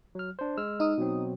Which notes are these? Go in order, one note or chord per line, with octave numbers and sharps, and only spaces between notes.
F#3 F6
D4 C5
G#3 E6 F6
D#4 D#6
B2 F#3 C4